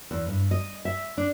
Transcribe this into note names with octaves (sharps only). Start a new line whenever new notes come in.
E2
G2
D#5
E5
D4